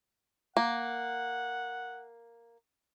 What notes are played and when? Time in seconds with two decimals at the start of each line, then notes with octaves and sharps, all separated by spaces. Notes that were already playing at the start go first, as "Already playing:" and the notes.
0.57 A#3 F#5